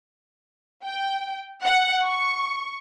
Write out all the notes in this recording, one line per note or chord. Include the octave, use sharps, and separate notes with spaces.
G5
F#5
C#6